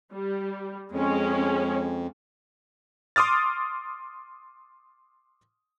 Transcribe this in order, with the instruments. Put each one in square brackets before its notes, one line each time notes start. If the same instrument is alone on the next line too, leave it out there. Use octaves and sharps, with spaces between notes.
[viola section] G3
[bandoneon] F2 [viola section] G#3 C#4
[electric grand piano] C6 D6 D#6 F6 A6